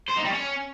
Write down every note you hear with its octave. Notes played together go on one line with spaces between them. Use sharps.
C5
D#4
G3
C#4